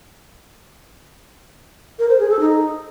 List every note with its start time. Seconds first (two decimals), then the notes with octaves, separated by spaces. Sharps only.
1.99 A#4
2.09 C5
2.19 G#4
2.30 A4
2.40 D#4